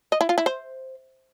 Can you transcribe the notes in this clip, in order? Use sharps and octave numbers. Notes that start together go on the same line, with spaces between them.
D#5
E4
F4
E4
C5